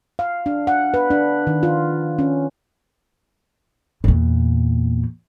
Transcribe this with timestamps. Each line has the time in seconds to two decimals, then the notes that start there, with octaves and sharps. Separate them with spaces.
0.19 F5
0.46 D4
0.67 F#5
0.94 B4
1.10 D4
1.47 D#3
1.63 F4
2.19 C#4
4.04 E2 A#2